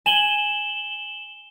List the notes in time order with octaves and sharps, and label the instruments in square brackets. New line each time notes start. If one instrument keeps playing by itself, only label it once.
[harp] G#5 [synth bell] E7 F#7 G7